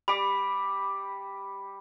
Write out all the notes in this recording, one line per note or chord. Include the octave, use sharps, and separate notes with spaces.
G3 B5 D6